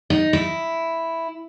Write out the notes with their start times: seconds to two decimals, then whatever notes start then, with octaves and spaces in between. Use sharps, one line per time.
0.10 D#4
0.33 E4